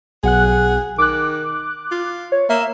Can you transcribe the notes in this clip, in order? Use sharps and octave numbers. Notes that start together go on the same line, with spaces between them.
B1 G#4 F#5 F#6
D#3 D6 F#6
F4
C#5
A#3 E5 E7